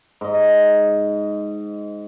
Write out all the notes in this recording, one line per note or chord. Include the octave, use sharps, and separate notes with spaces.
G#2 D#5